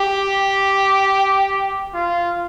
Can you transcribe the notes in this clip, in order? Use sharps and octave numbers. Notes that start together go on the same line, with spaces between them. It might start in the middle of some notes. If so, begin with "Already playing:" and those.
Already playing: G4
F4